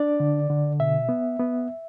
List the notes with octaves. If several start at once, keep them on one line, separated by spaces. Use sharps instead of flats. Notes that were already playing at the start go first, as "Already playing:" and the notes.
Already playing: D4 D5
D3
D3
B2 E5
B3
B3